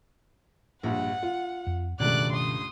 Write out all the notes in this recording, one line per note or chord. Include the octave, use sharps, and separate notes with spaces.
A#1 G2 F#5
F4
F2
C#2 G2 B2 D#3 A3 D5 F#6
C6 D#6